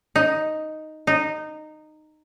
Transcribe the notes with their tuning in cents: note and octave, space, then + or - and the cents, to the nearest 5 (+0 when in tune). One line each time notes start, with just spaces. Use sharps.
D#4 +0
D#4 -15